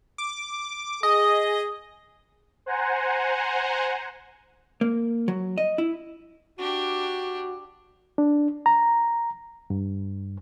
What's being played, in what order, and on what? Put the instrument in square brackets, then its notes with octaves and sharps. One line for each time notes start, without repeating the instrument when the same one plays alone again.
[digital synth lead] D6
[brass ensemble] G#4 [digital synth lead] D#5 [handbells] D#6
[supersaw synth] C5 F#5 G#5 A#5
[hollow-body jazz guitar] A#3
F#3
D#5
E4
[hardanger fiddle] D4 G4 [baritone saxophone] F#4
[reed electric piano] D4
A#5
G2